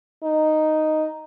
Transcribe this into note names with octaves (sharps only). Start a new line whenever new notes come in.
D#4